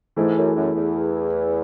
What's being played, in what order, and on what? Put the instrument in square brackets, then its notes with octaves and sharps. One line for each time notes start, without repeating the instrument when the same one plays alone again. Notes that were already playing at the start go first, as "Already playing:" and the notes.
[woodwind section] G#2 [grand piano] E3 A3 E4 G#4
[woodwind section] F#2
F#2
E2